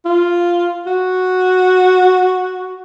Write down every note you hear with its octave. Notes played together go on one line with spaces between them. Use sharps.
F4
F#4